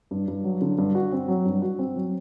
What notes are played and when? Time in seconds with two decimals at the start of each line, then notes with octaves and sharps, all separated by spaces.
0.11 G2
0.28 G2
0.44 F#3
0.61 D3
0.78 G2
0.95 F#4
1.12 C4
1.28 F#3
1.45 G2
1.62 F#4
1.79 C4
1.96 F#3